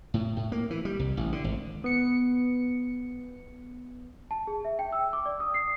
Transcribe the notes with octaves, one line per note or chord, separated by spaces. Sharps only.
A2
A2
A#3
E3
G3
C2
A1
D3
G#1
B3 C#7
A5
G#4
E5
G5
E6
D6
D5
D#6
C7